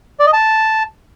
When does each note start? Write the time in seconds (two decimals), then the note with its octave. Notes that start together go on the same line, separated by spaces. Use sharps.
0.20 D5
0.26 D#5
0.33 A5